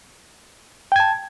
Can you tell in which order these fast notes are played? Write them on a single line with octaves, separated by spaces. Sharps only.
G5 G#6 A5